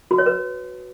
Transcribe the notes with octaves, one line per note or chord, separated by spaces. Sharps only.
F#4
C#5
B4